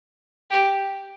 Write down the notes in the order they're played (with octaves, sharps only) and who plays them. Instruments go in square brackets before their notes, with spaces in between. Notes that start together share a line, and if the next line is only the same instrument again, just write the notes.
[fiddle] G4